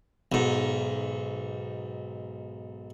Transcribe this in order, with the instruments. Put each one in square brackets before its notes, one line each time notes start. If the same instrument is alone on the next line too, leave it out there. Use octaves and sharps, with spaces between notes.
[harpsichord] B1 G#2